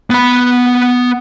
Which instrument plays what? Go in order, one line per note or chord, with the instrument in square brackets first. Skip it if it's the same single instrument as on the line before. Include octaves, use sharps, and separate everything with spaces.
[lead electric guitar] B3 B5